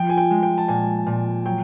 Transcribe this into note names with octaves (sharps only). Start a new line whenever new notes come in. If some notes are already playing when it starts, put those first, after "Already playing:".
Already playing: F3 G5
G#5
G5
G#3
G5
A5
A#2 G#5
A#2
F#3 G5